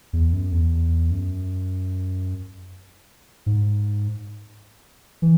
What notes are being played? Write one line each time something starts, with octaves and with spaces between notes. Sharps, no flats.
E2
F#2
E2
F#2
G#2
E3